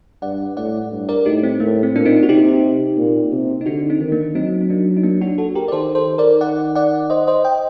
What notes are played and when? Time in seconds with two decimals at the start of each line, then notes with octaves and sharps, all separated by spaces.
0.22 G2 D5 F#5
0.57 A2 D5 F#5
0.91 G2
1.09 A#4 D5
1.25 A2 D#4 G4
1.43 C4
1.60 A2 A#3
1.83 C4
1.95 A#2 D4
2.06 C4 D#4
2.23 F#4
2.29 C3 D#4 G4
2.97 A#2
3.32 C3
3.61 D#4
3.66 D3 D4 F#4
3.90 C4 D#4
4.00 D#3
4.12 A#3 D4
4.35 F#3 C4 D#4
4.61 C4
4.70 A#3 D4
4.97 D#4
5.03 A#3 D4
5.21 D4 F#4
5.38 F#4 A4
5.55 G4 A#4
5.68 D5
5.72 D#3 A4 C5
5.95 A4 C5
6.07 D#3
6.18 A#4 D5
6.41 D5 F#5
6.75 D5 F#5
7.10 C5 D#5
7.27 C5 D#5
7.44 D#5 G5